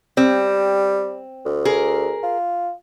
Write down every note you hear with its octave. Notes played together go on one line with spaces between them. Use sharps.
G3 C4
D2
G#4 A#4
F4